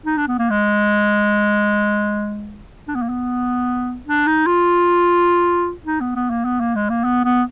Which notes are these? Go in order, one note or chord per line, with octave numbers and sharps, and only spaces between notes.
D#4
D4
B3
A#3
G#3
D4
B3
A#3
B3
D4
D#4
F4
D#4
B3
B3
A#3
B3
A#3
G#3
A#3
B3
B3